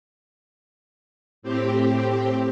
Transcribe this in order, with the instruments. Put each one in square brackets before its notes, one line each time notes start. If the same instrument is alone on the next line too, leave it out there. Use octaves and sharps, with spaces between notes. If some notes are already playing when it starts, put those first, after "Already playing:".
[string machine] A2 C4 G4